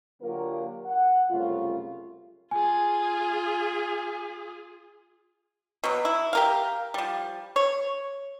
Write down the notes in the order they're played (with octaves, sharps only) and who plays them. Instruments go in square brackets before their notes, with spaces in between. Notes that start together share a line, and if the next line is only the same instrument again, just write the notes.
[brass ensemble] D3 F#3 A#3 F4 G4 A#4
F#5
C2 F#2 C#3 A3 F4
[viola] F4 G#4 [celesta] G#5
[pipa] B2 F#3
E4
G4 A#4 F5
F3 G3
C#5